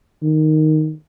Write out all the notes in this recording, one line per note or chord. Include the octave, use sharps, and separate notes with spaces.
D#3